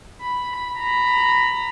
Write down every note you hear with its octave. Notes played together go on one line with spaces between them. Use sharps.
B5
A#5 B5